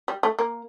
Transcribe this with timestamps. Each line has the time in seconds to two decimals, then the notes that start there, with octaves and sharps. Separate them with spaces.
0.08 G3
0.23 A3
0.39 A#3